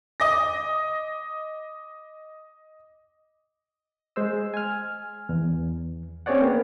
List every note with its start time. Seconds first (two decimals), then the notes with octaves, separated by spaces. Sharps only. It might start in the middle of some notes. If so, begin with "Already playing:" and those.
0.20 D#5 D6 A#6
4.16 G#3 C5 E6
4.54 G#5 F6
5.29 E2
6.26 C4 C#4 G#4 C#5 D5 F#5
6.41 A#3 B3